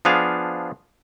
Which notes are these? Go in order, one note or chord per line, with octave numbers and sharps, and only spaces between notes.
F3 B3 D4 G#4 F5